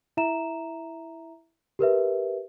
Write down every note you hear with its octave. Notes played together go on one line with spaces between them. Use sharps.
E4 E5 A#5 E7
G4 A#4 B4 E5